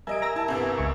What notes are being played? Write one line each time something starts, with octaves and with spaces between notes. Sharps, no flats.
G3 A#4 D#5 E5 G#5 D7
A#5 E6 A#6
E4 A5
G1 C2 B3
C#2 C#6